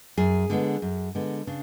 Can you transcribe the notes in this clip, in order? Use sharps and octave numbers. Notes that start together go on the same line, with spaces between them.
F#2 G#4
D3 G#3 B3
F#2
D3 G#3 B3
C#3 D4